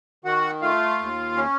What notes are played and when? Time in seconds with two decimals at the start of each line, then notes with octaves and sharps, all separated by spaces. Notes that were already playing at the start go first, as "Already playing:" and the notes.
0.25 D#3 F#4 F#5
0.62 A3 F4 F5
0.99 D#2
1.36 C#4